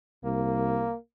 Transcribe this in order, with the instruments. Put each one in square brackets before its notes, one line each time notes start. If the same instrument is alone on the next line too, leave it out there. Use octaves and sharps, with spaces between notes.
[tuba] C2 [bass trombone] A#3